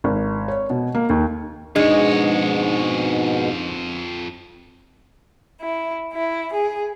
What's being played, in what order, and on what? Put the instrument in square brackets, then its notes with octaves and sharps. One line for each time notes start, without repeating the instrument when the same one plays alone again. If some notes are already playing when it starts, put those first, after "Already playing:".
[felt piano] G#1
C#5
B2
A#3
D#2
[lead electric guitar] F2 C#5 [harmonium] G#2 B2 [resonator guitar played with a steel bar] G#3 [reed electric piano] D4 D#4
[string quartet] E4
E4
G#4